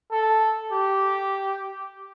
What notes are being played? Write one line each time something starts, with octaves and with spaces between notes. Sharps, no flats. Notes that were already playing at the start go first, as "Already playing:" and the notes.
A4
G4